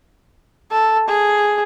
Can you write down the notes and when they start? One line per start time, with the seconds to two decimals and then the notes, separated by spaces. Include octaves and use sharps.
0.71 A4
1.08 G#4